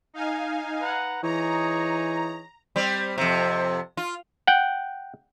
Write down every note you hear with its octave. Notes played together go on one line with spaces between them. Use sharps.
D#4 F5 G#5
B4 F#5 A#5
E3 D#4 G#4 C#5 A#5
G3 C4
F2 C3
F4
F#5 G5